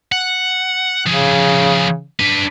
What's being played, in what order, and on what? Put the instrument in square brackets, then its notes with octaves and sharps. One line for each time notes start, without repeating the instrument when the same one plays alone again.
[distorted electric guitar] F#5
[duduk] C#3 [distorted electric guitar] F3 G#4
[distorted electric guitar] D4 B4